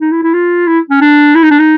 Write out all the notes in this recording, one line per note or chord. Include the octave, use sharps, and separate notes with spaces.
D#4
E4
E4
F4
E4
C#4
D4
E4
D#4
D4
D#4